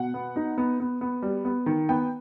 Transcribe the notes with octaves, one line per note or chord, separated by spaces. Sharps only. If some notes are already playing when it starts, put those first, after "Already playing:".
Already playing: B2 F#5
B3
D#4
B3
B3
B3
G3
B3
D#3
B3 G5